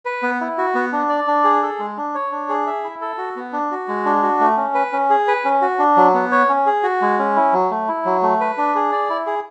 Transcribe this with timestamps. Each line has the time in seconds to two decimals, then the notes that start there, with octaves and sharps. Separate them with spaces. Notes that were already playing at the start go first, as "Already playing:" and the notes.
0.05 B4
0.23 B3
0.41 E4
0.58 F#4
0.75 B3
0.93 D4
1.09 D5
1.27 D4
1.44 G#4
1.63 A4
1.79 G#3
1.97 D4
2.15 C#5
2.32 D4
2.49 G#4
2.67 E5
2.84 E4
3.01 A4
3.18 F#4
3.36 B3
3.53 D4
3.71 F#4
3.88 G#3
4.06 D4
4.23 F#4
4.40 A3
4.57 C#4
4.74 B4
4.93 C#4
5.10 G#4
5.28 B4
5.45 C#4
5.62 F#4
5.79 D4
5.97 F#3
6.14 B3
6.32 C#5
6.49 C#4
6.66 G#4
6.83 F#4
7.02 G#3
7.19 C#4
7.36 E4
7.53 F#3
7.71 A3
7.88 E4
8.05 F#3
8.23 A3
8.41 B4
8.58 D4
8.75 G#4
8.92 D5
9.10 E4
9.26 G#4